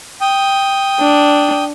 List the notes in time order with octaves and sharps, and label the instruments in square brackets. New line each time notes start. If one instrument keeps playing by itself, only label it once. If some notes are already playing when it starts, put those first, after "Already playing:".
[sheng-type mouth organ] G5 D#6
[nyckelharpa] D4